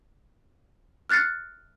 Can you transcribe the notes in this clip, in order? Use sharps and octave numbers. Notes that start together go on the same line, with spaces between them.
F6 F#6 A6 C7 C#7